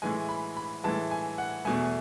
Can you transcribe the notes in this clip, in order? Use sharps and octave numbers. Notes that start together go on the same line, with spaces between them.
A2 E3 G#3 G#5
B5
B5
A2 E3 G#3 A5
G#5
F#5
E2 B2 A3 G#5